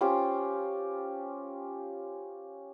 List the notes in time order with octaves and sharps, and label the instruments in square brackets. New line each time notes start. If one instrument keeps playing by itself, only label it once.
[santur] C#4 F4 G4 C5